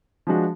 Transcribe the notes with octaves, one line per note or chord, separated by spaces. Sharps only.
F3 G#3 D4 F#4